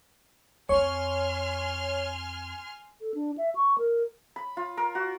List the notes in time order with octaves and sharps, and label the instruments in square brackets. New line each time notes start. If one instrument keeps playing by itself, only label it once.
[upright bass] F2 C4 [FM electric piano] C#5 [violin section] G#5 C6 F6
[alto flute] A4
D4
E5
C#6
A#4
[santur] B5
F4
A#4
F#4